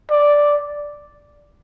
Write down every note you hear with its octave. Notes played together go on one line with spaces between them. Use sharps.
D5